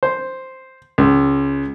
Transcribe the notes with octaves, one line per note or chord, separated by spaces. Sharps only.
C5
C#2